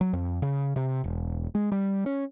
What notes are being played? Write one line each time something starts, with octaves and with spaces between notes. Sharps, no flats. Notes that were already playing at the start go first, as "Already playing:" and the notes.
F#3
F2
C#3
C3
E1
G#3
G3
C#4